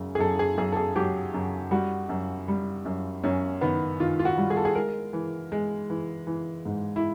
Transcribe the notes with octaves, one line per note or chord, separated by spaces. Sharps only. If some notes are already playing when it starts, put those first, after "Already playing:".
Already playing: F#2 C#3
G#4
F#2 A4
G#4
F#2 G#4
A4
G#4
F#3 G4
F#2
G3 F#4
F#2
G3
F#2
F#2 C#4
D#3 B3
D#3 F4
F4
F#4
G3
G#4
A4
G#4
G#3 A#4
E3
G#3
E3
E3
G#2
E4